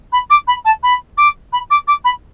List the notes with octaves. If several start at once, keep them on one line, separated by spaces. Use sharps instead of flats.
B5
D6
B5
A5
B5
D6
B5
D6
D6
B5